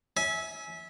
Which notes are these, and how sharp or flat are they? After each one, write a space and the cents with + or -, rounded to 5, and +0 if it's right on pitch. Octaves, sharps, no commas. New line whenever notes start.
E5 -20 G#5 +20